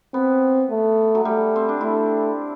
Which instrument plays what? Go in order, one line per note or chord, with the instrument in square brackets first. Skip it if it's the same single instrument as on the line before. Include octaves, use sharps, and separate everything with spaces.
[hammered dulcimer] B3 [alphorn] C4
[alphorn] A3
[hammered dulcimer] F#3
[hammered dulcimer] G3 [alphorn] A3
[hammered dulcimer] C4
D4
[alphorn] A3 [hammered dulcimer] E4